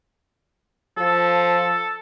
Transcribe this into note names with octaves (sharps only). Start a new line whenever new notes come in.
F3 A4